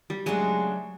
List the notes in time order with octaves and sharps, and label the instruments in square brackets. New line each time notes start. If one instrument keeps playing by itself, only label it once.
[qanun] G3
[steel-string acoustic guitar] C#3 F#3 A3 D4 [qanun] G#3